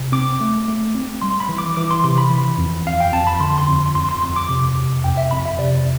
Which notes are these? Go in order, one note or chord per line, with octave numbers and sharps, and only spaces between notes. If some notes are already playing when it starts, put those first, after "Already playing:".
Already playing: C3
C4 D6
A3
A3
C4
G3 C6
B5
E3
D6
E3 D6
C6
C3 C6
B5
E3
F2
F2 F5
G5
F2 A5
B5
D3 C6
C6
F2
C6
F2 C6
C6
F2 C6
D6
C3
C3
F2 G5
E5
F2 B5
E5
C3 D5